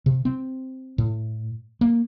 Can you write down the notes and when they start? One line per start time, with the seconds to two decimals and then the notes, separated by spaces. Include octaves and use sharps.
0.06 C3
0.25 C4
0.98 A2
1.81 A#3